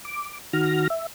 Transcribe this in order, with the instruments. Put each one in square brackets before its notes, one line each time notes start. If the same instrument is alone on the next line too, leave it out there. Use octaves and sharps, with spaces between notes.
[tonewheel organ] D6
D#3 F#4 F6 A#6
E5